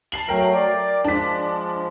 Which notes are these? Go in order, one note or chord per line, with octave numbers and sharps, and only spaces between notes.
A5 C7 F#7
F#3 A3 A#4 G5
D5
F3 G#3 D4 B6